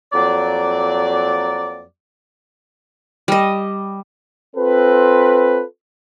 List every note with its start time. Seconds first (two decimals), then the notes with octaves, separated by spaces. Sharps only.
0.13 F2 F#3 A#3 D5
3.28 G3 D#5
4.56 C4 F4 A4 B4